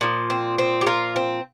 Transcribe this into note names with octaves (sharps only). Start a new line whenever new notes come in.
A#2 F3
C4
C4
G4
F4 A#4
C4